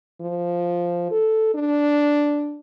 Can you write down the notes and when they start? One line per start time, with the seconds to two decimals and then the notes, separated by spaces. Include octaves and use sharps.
0.21 F3
1.11 A4
1.54 D4